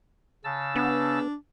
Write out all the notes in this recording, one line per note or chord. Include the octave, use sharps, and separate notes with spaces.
C#3 A5 E6
B3 D4